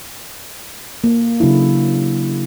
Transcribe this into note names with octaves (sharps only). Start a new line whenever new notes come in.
A#3
C#3 F#3 D4 E4